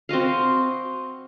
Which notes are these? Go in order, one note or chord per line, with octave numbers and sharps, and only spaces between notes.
C4 F#4 D#5 F5